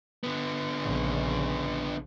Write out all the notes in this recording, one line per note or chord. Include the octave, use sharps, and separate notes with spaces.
D3 B3
A#1 C#3